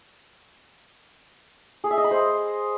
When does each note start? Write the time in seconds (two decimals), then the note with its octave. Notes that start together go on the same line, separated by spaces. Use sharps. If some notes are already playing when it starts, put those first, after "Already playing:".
1.84 G#4
1.91 E5
1.97 D#5
2.04 B5
2.11 C5